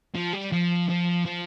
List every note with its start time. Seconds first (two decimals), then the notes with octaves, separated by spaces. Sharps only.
0.15 F3
0.33 G3
0.52 F3
0.89 F3
1.26 F3